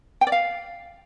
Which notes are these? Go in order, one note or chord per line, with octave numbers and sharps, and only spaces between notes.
G5
D5
F5